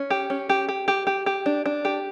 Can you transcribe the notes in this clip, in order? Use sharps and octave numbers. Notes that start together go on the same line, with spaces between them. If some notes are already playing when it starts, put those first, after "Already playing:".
Already playing: C#4
G4
C#4
G4
G4
G4
G4
G4
D4
D4
G4